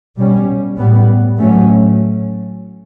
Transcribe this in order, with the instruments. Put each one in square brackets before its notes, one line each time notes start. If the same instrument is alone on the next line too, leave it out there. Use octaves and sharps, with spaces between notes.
[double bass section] B2 G3 C#4
A2 G3 B3
A2 F#3 A3 C#4